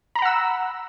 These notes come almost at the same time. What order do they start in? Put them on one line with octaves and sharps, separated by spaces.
A#5 B5 F#5 E6